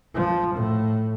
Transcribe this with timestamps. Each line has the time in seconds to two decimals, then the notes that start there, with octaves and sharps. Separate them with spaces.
0.15 F3
0.55 A2